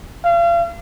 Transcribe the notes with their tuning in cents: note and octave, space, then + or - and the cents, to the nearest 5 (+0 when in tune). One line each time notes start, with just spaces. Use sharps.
F5 -35